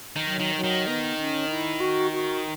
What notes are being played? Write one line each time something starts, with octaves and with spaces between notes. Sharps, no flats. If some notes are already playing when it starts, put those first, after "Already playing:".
D#3
F#3
D#3
F#3
D#3
B3
C#4
E4
F#4
F#4